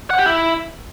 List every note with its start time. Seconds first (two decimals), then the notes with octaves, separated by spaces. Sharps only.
0.10 F#5
0.18 G4
0.26 E4